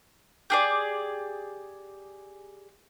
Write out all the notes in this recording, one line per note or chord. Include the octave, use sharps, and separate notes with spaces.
G4 G#4 D5